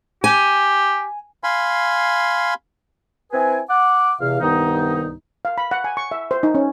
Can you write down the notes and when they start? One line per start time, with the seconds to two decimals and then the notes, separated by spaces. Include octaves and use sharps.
0.24 G4 G#5
1.44 F5 G#5 B5 C6
3.32 C4 E4 B4 G5 G#5
3.70 F#5 D6
4.21 E2 C3 F5
4.41 C2 G2 D#3 B3 D#4
5.45 F5
5.58 B5
5.71 F#5
5.84 G#5
5.97 C#6
6.11 E5
6.31 C5
6.43 D#4
6.55 C#4